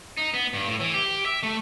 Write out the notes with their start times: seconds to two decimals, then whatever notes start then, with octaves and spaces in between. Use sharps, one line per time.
0.17 D#4
0.34 B3
0.54 G2
0.67 A2
0.80 E3
0.94 G4
1.26 E5
1.43 A3